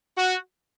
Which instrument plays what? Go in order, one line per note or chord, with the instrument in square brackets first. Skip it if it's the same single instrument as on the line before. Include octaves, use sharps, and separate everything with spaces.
[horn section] F#4